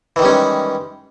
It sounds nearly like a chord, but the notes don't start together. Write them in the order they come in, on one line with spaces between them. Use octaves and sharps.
E3 D#3 G3 C#4 G#3